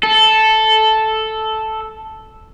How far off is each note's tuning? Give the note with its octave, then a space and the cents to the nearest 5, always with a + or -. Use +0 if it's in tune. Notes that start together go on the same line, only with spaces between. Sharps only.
A4 -5